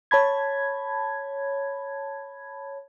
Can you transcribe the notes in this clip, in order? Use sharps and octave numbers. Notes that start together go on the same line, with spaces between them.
C#5 A5 B5 G#6